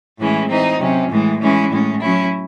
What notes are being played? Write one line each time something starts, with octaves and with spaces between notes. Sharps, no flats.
A2 E3 G#3 C#4 E4
E3 C4 D#4
C3 F#3 C#4
A2 E3 G#3
E3 G#3 C#4 E4
A2 G#3 C#4
F#3 C#4 E4